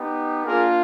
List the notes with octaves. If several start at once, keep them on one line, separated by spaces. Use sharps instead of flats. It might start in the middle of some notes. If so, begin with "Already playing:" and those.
Already playing: B3 D#4 G4
A#3 D4 F4 G#4 A#4